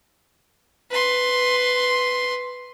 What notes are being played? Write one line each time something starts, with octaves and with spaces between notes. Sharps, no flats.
B4 C6